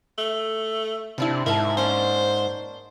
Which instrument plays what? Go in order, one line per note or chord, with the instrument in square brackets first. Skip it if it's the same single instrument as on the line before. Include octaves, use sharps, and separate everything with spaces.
[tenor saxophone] A3
[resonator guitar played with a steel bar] G2 D4 E4 [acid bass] C3
[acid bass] G#2 [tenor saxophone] E4 [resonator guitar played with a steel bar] A#4 F5 A5
[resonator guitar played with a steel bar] A#3 C#4 D4 [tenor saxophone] C5